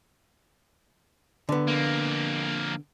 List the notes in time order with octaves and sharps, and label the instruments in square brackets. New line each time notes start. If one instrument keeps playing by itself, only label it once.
[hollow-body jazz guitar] D3 B3
[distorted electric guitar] F2 A#3